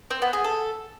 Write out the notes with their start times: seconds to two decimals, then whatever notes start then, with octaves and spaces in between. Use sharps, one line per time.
0.11 C4
0.22 B3
0.33 G#4
0.44 A4